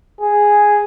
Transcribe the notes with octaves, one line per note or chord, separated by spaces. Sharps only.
G#4